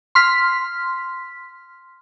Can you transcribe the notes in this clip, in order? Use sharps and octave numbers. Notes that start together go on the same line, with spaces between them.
C6 F6 B6